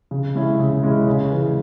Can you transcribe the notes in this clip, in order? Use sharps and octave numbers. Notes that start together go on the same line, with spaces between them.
C#3
G#3 C#4 E4
C#3
G#3 C#4 E4
C#3
E3 G#3